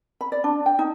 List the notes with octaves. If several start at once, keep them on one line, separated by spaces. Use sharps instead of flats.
B5
D5
D4
G5
D#4